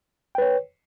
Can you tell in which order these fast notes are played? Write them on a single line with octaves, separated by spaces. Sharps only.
G5 B4 C#5